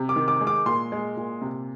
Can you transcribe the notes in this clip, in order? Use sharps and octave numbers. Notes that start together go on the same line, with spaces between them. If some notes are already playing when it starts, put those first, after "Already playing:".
Already playing: C3
D6
D#3
D6
G#3
D6
A#2 C6
G#3
A#2
C3